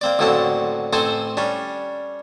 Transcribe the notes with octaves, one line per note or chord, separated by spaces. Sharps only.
A#3 C4 D5
A1 D3 F#3 A#3 C4 A5
A1 C4 A4 C5 G#5
G3 C#4 D4